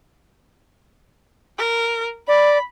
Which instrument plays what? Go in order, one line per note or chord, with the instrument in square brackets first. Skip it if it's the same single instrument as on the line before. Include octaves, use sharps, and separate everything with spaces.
[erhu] A#4
[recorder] D5 [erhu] B5